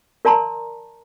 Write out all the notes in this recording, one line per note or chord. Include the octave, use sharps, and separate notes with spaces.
A#4 D5 A5 A#5 C6